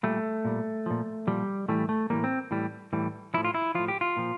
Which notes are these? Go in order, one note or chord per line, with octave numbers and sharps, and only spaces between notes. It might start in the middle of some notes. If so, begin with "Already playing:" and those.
A#2 G3 A3
A#2 G3
A#2 F3
A#2 F3 G3
A2 E3 G3 A3
A3
A2 E3 G3 A#3
C4
A2 E3 G3
A2 E3 G3
A2 F3 E4
F4
E4
A2 F3 F4
G4
F4
A#2 F3